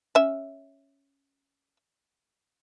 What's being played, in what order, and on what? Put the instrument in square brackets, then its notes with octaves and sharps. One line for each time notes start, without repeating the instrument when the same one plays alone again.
[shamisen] C#4 E5